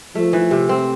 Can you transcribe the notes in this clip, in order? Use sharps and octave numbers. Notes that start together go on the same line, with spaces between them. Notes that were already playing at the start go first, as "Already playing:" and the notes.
F3 A3
E3
C3
C4